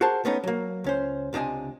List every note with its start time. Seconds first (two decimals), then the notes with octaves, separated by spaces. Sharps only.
0.01 F#4 G#4 A#4 C5 A5
0.25 A3 B3 C#4 D#4
0.44 F#3 A#3
0.84 C#2 C#4 C5
1.33 C#2 C3 D4 D#5 G#5